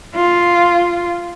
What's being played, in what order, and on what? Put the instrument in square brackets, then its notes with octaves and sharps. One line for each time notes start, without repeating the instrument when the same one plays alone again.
[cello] F4